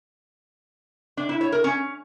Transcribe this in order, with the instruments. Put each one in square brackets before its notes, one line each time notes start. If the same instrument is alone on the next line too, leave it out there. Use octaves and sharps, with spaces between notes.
[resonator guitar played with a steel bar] D4
E4
C#5
A#4
C#4